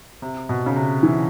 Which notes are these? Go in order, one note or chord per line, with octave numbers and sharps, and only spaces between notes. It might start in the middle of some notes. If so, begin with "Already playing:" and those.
C3
B2
C#3
C3
E3